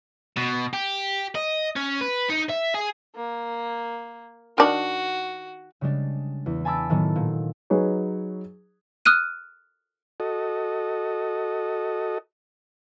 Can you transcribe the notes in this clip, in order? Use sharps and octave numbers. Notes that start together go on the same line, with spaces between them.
B2
G4
D#5
C#4
B4
D#4
E5
G#4
A#3
D#3 D4 F#4
C#3 G3 G#3 D4
E2
G#5 A5 B5 D6 E6 A6
A2 D#3 F#3 B3
A#2
F#3 D#4 G#4 B4 C#5
D#6 F6 F#6 D#7
F#4 A4 D#5